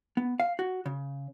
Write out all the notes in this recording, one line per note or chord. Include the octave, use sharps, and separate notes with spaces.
B3
F5
F#4
C#3